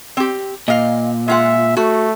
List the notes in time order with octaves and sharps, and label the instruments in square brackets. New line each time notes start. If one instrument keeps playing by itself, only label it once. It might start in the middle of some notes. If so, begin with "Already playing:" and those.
[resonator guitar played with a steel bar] C4 G4
[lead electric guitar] A#2 [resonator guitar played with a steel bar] D#5 F5
[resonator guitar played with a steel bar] G#3 F4 F#5 [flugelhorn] E5
[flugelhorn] A3 [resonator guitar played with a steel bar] F#4